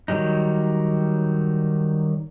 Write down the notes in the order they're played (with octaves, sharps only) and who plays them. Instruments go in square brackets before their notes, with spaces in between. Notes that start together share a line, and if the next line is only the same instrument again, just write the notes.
[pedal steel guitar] D#3 F#3 G3 D#4